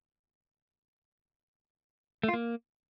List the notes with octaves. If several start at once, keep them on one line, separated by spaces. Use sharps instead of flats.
A3
F4
A#3